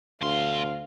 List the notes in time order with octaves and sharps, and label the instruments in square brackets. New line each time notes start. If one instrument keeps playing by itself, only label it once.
[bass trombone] D2 [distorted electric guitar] B2 C6 [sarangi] F5